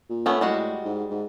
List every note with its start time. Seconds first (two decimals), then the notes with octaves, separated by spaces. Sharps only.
0.10 A#2
0.26 A3 B3 C#4
0.41 A2 G3 G#3 F#4
0.85 G#2
1.10 G#2